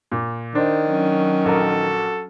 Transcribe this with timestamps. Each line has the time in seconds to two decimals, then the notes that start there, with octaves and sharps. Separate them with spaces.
0.12 A#2
0.55 D#3 D4 C5
0.86 F#3 C#4
1.45 A#1 F#4 A4 A#4